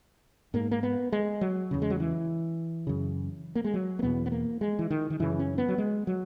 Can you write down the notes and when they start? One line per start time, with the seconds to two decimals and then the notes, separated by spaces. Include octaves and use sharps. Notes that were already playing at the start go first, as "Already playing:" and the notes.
0.54 G#2 A#3
0.71 A#3
0.83 B3
1.12 G#3
1.41 F#3
1.71 E2 C#3
1.82 G#3
1.90 F#3
2.00 E3
2.87 F#2 C#3
3.55 A#3
3.64 G#3
3.74 F#3
3.99 A#3
4.03 E2 B2 B3
4.26 B3
4.32 A#3
4.61 G#3
4.79 E3
4.91 D#3
5.10 D#3
5.19 F#2 C#3 E3
5.39 C#4
5.58 B3
5.69 F#3
5.78 G#3
6.07 F#3